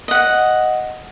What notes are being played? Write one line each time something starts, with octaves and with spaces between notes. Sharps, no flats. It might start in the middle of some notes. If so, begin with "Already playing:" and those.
D#5 F#5